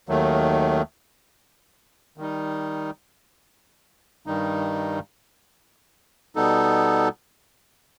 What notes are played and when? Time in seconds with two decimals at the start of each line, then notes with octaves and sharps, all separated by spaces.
0.08 D#2 D#3 F#3 A3
2.18 D#3 G3 D#4
4.26 G2 D#3 G3 D#4
6.35 B2 G3 B3 D#4 A4